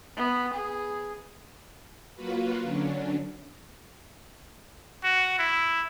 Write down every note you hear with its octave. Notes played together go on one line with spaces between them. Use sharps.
B3
G#4
F#3 A#3 F4 F#4 B4
D3 F#3 C#4 D4
F#4
E4